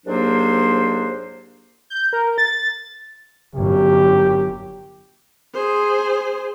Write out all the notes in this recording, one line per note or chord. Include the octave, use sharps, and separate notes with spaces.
C2 G#2 F#3 A#3 D4 C5
G6
A#4
A6
G1 F#2 G4
G#4 C5